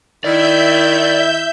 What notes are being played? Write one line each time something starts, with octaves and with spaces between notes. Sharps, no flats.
D#3 E4 D5 E5 G6